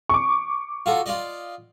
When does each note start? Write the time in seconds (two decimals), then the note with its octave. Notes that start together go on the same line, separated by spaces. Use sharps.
0.09 C#6 D6
0.86 F4 F#4 A4
1.06 F4 D5 D#5